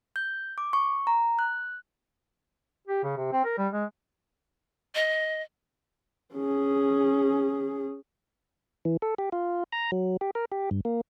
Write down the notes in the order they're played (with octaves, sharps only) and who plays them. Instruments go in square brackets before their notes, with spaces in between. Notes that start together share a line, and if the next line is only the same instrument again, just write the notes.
[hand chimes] G6
D6
C#6
A#5
F#6
[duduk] G4
C#3
C3
C4
A#4
G3
G#3
[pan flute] D#5
[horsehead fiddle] C#4 G#4
[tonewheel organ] E3
A4
G4
F4
A#5
F#3
G4
A#4
G4
G2
A#3